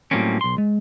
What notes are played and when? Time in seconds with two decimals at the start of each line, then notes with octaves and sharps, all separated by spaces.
0.11 A2 F#3 G3 A#3 C4 C#4
0.41 B1 C6
0.58 G#3